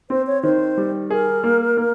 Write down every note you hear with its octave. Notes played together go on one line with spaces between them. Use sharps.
C4 C5
C#5
D#3 C5
G3
G#4 A#4
A#3
A#3